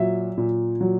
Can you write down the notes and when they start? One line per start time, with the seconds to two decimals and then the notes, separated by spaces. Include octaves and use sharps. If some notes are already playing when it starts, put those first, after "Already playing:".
Already playing: A#2 F#3 E5
0.38 A#2
0.81 F#3